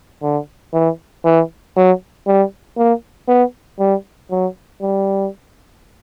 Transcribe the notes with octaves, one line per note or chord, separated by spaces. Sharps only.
D3
E3
E3
F#3
G3
A#3
B3
G3
F#3
G3